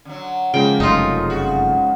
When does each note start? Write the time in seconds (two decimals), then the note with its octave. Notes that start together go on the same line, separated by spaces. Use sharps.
0.05 D3 F#3
0.54 C#3 F3 G#3 A#3 G5
0.80 F1 F#2 A3 D#4 F4
1.30 F#4